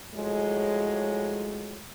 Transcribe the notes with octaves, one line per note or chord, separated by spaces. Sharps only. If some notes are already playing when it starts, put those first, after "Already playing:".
A2 F3 F#3 G#3